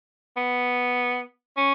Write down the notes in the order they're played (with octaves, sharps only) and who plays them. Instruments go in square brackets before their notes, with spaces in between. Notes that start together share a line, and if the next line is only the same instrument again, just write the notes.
[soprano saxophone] B3
C#4